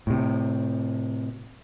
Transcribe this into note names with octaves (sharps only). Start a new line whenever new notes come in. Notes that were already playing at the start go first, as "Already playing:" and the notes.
A2 C3